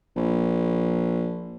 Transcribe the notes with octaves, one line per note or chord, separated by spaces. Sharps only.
A#1